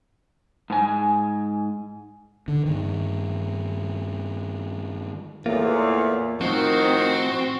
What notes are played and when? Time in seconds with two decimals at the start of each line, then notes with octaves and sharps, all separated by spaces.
0.70 G#2 G#5
2.48 D3
2.66 G2 D#3
5.46 E2 A2 A#3 F4
6.41 A2 D#3 F3 C4 F#4